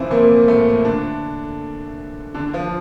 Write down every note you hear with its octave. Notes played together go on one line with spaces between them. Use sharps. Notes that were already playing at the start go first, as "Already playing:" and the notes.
Already playing: C3 E3 F3 C4 E4 F4
A#2 A#3
A2 A3
D3 D4
D3 D4
F3 F4